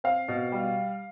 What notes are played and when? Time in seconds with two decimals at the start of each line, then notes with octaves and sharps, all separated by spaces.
0.04 C4 F5
0.28 B2
0.52 G3